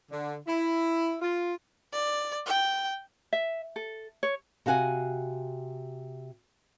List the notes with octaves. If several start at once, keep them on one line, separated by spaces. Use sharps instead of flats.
D3
E4
F4
D5
G5
E5
A4
C#5
C3 F#4 F5 F#5 G#5